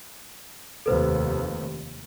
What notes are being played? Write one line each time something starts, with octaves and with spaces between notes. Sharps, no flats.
F1 D#2 A4 B4 C5